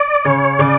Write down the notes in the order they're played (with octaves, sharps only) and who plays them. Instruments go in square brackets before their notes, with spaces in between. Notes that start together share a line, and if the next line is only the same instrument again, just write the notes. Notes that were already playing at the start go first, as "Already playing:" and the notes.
Already playing: [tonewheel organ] D5
[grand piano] C#3 [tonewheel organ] C#5
[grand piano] C#3 [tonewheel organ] D5